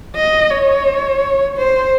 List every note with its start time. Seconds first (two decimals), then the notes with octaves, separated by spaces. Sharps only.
0.16 D#5
0.51 C#5
1.57 C5